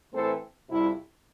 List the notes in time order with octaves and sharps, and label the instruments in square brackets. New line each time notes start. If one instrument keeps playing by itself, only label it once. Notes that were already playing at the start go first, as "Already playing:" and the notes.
[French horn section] A2 E3 A3 C4 A4 C5
F2 C3 G3 E4